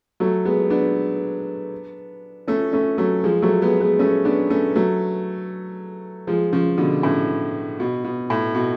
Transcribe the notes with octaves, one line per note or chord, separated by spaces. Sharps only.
F#3 A3
G#3 B3
B3 D4
A3 C#4
A3 C#4
F#3 A3
F3 G#3
F#3 A3
G#3 B3
G#3 B3
A3 C#4
B3 D4
A3 C#4
F#3 A3
F3 G#3
C#3 F3
B2 D3
A2 C#3
B2
B2
A2
B2